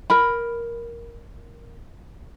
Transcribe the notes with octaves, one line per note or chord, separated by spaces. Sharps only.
A#4 B5